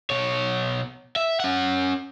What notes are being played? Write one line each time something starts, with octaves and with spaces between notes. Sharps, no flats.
B2 C#5
E5
C#4 F#5